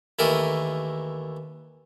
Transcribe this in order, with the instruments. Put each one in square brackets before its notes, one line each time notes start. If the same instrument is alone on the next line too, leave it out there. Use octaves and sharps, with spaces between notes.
[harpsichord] D#2 E3 A3 A#4 D#5